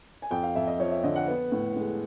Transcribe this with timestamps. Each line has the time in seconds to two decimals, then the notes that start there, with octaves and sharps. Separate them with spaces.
0.22 G#5
0.31 F2 G5
0.43 F5
0.55 F2 E5
0.67 D#5
0.80 F3 C#5
0.91 E5
1.03 D3 D#5
1.16 F#5
1.27 B3
1.52 A2
1.76 G#3